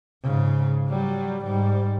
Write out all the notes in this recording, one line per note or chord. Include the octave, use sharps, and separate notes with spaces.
G#2 C#3
F#3 G3
G#2 G3